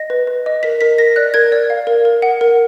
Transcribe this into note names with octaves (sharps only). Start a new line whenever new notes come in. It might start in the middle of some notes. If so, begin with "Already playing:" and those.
Already playing: D#5 A#6
B4
B4
D#5
A#4 B6
A#4 B6
A#4 A#6
D5 F#6
A#4 G#6
D5
F5
A#4
A#4
F#5
A#4